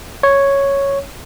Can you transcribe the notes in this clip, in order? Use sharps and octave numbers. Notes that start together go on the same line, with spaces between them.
C#5